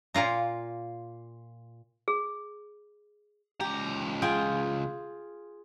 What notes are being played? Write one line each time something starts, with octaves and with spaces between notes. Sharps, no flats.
A#2 A#3 F4 A#5
G#4
C#2 G4 A#5
F4 G#4 G5